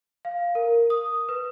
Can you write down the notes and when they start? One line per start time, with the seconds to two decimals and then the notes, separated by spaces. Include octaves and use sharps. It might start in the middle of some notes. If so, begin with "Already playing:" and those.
0.25 F5
0.55 A#4
0.90 D#6
1.29 B4